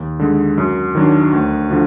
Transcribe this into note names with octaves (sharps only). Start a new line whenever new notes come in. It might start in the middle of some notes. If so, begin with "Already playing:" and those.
Already playing: D#2
D3 G#3
F#2
D#3 F#3 D4
D2
D3 F3